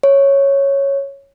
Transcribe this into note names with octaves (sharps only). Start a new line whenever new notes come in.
C#5